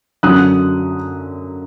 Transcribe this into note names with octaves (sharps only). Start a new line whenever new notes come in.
F#2 D3 F#3 D#6 F#6